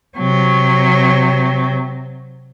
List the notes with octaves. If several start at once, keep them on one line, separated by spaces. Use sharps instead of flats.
C3 F#3